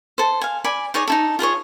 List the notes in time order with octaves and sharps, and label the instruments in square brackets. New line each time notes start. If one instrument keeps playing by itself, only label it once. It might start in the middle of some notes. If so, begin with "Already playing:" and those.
[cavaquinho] A4 C5
F5 G#5
D5 G#5 B5
D#4 G#4 C#5 D5
D#4 E4 A4
F4 G#4 B4 C#5